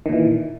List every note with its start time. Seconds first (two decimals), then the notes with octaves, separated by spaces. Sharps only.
0.06 D#3
0.09 A#2
0.13 E3